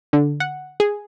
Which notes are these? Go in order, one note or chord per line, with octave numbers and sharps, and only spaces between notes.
D3
F#5
G#4